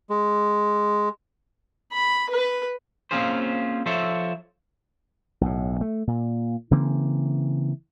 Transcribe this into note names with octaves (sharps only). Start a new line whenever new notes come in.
G#3
B5
B4
A#3 C4 C#4 F4 G#4 C5
F3 A4 C5 C#5 E5
B1 A2
A3
A#2
C#3 E3 A#3 C4